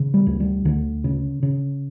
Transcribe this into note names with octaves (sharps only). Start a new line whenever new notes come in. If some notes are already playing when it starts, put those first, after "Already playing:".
Already playing: C#3
G3
D2
G3
D2 D3
C#3
C#3